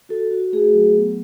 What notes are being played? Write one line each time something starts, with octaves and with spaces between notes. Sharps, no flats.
F#4 A4
F#4
A3 G#4
F#3
B3